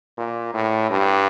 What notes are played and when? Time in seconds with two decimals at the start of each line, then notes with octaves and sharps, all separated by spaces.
0.17 A#2
0.54 A2
0.90 G2